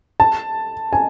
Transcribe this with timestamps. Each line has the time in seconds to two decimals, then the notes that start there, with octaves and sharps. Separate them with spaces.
0.20 A5
0.93 G#5